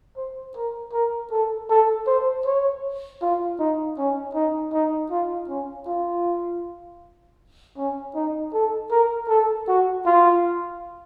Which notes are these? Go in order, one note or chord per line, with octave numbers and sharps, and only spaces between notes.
C5
A#4
A#4
A4
A4
C5
C#5
F4
D#4
C#4
D#4
D#4
F4
C#4
F4
C#4
D#4
A4
A#4
A4
F#4
F4